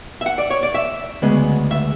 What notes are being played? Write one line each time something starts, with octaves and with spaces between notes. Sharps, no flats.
E5
F#5
D5
C#5
D5
E5
D2 C#3 G#3 B3
E5